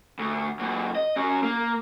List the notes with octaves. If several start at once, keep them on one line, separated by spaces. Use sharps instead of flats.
D2
F#2 A#2
D#5
C#4 F#4
A#3